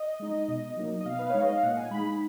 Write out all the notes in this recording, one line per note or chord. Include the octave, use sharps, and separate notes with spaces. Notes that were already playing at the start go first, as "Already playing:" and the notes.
Already playing: D#5
G#3 D#4
B2
F#3 A#3 D#4
D#5
B2 F5
B4
G#3 D#4 C#5
D#5
F5
A#2 F#5
G#5
G#3 D#4 B5
B5